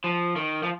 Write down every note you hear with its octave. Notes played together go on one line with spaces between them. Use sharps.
F3
D#3
F3